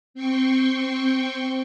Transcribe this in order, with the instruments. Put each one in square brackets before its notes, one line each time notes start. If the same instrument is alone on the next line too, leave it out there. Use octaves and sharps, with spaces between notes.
[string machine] C4 G5 C6 C#6